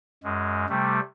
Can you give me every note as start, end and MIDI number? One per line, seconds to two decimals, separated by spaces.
0.24 0.66 42
0.24 0.66 56
0.69 1.00 48
0.69 1.00 55
0.69 1.00 57